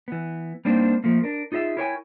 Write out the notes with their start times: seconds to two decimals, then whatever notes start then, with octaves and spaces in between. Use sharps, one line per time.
0.08 E3 B3
0.65 G3 A#3 C4 D4 D#4 C5
1.04 F3 A3 A#3
1.24 D4 A#4
1.52 D#4 F4 G#4 D#5 E5
1.77 E4 A#4 C#5 D5 G5 G#5